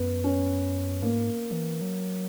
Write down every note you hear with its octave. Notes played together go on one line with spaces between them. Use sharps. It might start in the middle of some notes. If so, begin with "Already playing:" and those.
Already playing: F#2 B3
C#4
G#2 A#3
D#3
E3
F#3